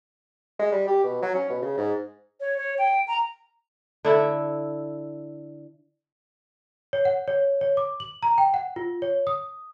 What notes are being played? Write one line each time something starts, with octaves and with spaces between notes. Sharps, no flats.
G#3
G3
G4
B2
F#3
C#4
B2
C#3
G#2
C#5
C#5
G5
A#5
D3 E4
C#5
F#5
C#5
C#5
D6
F#7
A#5
G5
F#5
F4
C#5
D#6